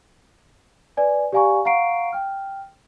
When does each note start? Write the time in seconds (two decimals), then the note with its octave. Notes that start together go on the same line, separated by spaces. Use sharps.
0.97 B4 D5 G#5
1.32 G4 D5 F5 G#5 A#5 C#6
1.65 F5 F#5 A#5 C#6 C7 D7
2.13 G5 F6